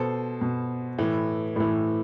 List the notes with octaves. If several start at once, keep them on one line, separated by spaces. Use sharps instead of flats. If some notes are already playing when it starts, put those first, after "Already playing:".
Already playing: B2 A4 C5
B2
A2 E3
A2 E3